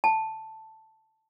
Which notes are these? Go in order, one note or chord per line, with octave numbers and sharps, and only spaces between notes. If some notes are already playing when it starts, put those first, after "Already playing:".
A5